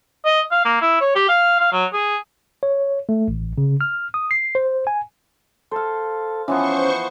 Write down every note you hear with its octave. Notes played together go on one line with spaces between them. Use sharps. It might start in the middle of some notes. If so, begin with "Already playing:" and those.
D#5
F5
A#3
E4
C#5
G4
F5
F5
F#3
G#4
C#5
A3
A1
C#3
F6
D#6
C7
C5
G#5
A4 C5 F5
E3 F3 B3 C#4 C5 C#6